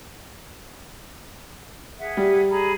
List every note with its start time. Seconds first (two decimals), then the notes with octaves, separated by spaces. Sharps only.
1.99 G#4 E5 F#5
2.17 G3
2.50 G#4 A#5 B5